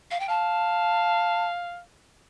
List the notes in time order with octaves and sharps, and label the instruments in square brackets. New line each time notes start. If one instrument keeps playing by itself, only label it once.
[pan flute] F5
G5
[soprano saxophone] F5 [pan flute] A5